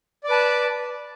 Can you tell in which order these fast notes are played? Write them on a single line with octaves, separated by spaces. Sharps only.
D5 D6 B4 A5